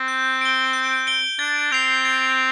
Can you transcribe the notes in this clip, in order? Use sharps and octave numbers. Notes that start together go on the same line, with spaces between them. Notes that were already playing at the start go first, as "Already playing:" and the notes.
Already playing: C4
G6
D7 G7
G6
D7 G7
D4 A6
C4 C7 F7
A6